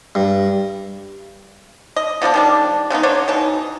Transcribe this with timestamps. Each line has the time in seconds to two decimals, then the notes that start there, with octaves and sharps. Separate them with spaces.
0.15 G2
1.96 D#5
2.22 D3 F3 B3 D4
2.34 D#3 G3 D4
2.90 C#3 G#3 B3 D#4
3.03 D3 D4 C5 C#5
3.28 B2 E3 D#4